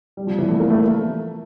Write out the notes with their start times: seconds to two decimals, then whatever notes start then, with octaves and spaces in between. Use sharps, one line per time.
0.17 G3
0.27 F3
0.38 E3
0.48 A3
0.60 A#3
0.70 A3